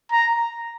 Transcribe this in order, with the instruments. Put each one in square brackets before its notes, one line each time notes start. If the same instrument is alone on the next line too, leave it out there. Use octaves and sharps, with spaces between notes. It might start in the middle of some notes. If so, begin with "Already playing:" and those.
[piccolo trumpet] A#5